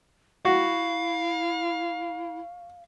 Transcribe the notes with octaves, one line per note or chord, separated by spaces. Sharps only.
E4 F#4 F5